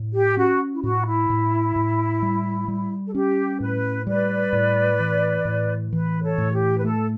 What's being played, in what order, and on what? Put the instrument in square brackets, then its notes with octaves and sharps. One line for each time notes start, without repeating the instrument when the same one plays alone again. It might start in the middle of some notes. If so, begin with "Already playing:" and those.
Already playing: [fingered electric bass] A2
[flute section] G4
[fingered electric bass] C#4 [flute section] F#4
[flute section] E4
[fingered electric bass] A2 [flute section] F#4
[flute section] E4
[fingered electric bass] A2
A2
G3
G3
[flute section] A4
[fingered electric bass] C#4 [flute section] G4
[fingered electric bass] A2 [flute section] B4
[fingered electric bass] G3 [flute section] B4 D5
[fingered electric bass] A2
E3
A2
[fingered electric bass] E3 [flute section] B4
[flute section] A4 C#5
[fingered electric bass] A2
[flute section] G4
B4
[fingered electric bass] A3 [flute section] A4